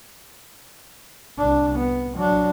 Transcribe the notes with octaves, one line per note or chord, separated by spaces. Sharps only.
C2 D4
B3
F#3 D4